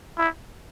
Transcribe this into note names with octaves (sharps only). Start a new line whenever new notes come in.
E4